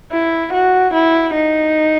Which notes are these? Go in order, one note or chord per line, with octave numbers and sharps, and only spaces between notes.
E4
F#4
E4
D#4